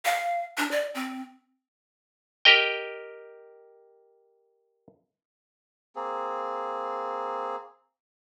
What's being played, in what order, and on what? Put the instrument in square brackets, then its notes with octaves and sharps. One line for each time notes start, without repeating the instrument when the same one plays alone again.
[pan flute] F5
D4
D5
C4
[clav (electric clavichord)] G4 A#4 D#5 G5
[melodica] A#3 C4 G#4